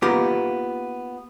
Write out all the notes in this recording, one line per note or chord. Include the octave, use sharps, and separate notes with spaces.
A#3 B3 D#4 F4 G4